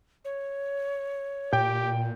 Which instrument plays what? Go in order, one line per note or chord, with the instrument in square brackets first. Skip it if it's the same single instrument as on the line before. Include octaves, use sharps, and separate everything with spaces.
[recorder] C#5
[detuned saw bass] A#2 [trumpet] G4 [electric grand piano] G5 G6